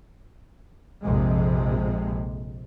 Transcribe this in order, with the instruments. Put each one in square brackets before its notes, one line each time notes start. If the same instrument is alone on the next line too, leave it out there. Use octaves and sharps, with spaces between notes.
[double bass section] A#1 F2 C3 G#3